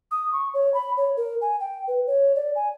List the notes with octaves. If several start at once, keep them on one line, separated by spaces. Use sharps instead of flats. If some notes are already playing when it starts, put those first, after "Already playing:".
D#6
C#6
C#5
B5
C#5
A#4
G#5
G5
B4
C#5
D5
G#5